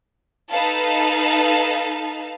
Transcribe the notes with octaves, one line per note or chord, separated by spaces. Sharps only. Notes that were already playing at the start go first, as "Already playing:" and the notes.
D#4 A4 B4 F5 A5